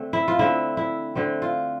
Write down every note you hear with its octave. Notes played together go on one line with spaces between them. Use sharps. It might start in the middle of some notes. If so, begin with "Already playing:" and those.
Already playing: D3 A3 C4
E4
F4
D3 A3 C4 E4
E4
D3 A3 C4
F4